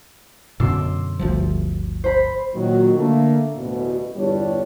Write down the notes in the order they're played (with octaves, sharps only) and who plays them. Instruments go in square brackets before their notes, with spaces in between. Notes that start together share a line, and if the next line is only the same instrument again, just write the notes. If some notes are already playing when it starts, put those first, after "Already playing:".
[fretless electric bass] F#2 B2 D3 [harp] C6 D6 E6
[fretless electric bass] G1 D2 F3
[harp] C5 B5
[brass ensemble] A#2 D#3 F#3
D3 A3 A#3
A1 D2 B2
G1 E2 G2 G3 D4 C#5